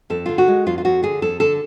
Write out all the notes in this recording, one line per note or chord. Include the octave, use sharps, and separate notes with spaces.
F2 A4
D3 F4
F#4
G#3
F2 F4
F4
F2 F#4
D3 G#4
F2 A4
D3 A4